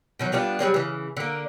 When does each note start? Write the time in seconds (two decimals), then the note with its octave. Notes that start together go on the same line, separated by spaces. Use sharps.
0.19 B2 D#3 F#3
0.33 G3 B3 D4 F4
0.59 F#3 G3 A#3 G#4
0.74 C#3 E3
1.17 D3 A#3